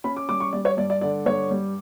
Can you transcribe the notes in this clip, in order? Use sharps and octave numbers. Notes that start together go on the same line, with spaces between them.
C#4 B5
D6
G3 D6
C#6
G3 D5
C#5
G2 D5
D5
D3 D5
G2 C#5
G3